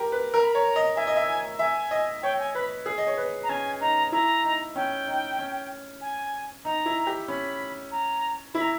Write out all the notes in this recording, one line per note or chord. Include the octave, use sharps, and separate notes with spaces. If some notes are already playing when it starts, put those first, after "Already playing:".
Already playing: G4 A#4
B4
A#4 A#5
B5
C#5 A#5
D#5
E5 G#5
D#5
E5
E5 G#5
D#5
C#5 G5
G#5
B4 B5
G#4
D#5
C#5
B4
A#5
C#4 G#5
D#4 A#5
E4 A#5
D#4
C#4 G5
D#4
C#4
G#5
D#4 A#5
E4
G4
C#4 B5
A#5
E4 B5
A#5